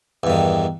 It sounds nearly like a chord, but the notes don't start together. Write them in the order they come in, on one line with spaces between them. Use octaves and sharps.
E2 G2 D#3